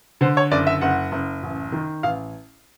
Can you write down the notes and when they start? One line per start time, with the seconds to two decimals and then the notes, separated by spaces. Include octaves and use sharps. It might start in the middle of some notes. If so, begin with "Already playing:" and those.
0.21 D3 C5
0.37 C#5
0.51 F#1 D5
0.67 E5
0.81 F#1 F#5
1.12 F#1
1.43 A1
1.72 D#3
2.03 A1 F5